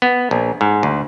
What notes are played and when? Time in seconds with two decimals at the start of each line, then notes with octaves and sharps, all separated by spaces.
0.02 B3
0.31 A#1
0.61 G#2
0.83 D2